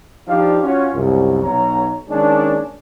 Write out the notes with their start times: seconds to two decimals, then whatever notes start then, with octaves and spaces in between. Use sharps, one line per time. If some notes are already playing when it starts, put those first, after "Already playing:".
0.28 F3 D4 D#4 G4 D5 F5
0.62 C#4 F4 F#4 C#5
0.94 C2 F#2
1.43 B1 C#5 A#5
2.09 D#3 G#3 A#3 C#4 D4